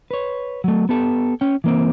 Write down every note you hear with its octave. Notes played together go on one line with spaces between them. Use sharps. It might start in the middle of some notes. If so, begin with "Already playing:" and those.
B4 C#5
F#3 A3
B3 G4 A4
C#4 G5
E3 A#3 C4